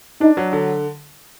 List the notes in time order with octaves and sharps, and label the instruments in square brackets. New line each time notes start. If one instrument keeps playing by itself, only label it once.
[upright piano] D4 [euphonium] D#4
[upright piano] F#3
D3